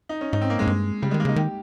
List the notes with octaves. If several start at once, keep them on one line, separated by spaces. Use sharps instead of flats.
D#4
C#4
G#2 D#4
C4
A#3
G#2 G#3
G2
C#3 G3
G#3
D#3
A#3
C#3 D#4
D#3 G4